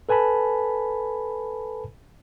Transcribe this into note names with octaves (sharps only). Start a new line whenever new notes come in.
A4 B4 G#5 A5 B5